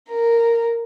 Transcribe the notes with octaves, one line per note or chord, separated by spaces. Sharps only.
A#4